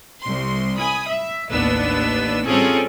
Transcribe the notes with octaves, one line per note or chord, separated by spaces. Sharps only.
C2 C6
G#5 B5 D#6
E5
A1 D#2 B3 D4 B4 E6
G3 C4 C#4 F4 G#4 A4